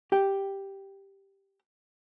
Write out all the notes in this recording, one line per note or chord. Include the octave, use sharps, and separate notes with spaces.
G4 G5